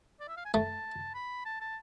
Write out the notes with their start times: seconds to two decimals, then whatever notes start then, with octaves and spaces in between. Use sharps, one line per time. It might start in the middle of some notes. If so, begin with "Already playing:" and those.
0.20 D5
0.28 E5
0.37 F5
0.45 G#5
0.54 A3 A5
1.14 B5
1.45 A5
1.61 A5